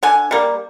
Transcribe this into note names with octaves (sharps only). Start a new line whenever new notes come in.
D3 G#5
G3 A#3